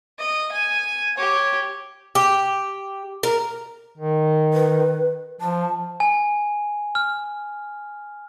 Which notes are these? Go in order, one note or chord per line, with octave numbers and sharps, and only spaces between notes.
D#5
G#5
G4 C#5
G4
A#4
D#3
B4
F3 A5
G#5
F6